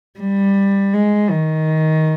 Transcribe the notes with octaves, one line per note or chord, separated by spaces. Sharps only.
G3
G#3
D#3